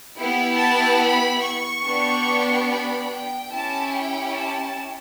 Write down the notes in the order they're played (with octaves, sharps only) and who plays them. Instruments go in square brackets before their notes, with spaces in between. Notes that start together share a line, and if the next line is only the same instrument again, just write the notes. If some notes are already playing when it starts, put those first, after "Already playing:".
[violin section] B3 E4 G4
A5
B5
C#6
B3 D4 G4
B5
G5
C#4 E4 G4 A5
G5
A5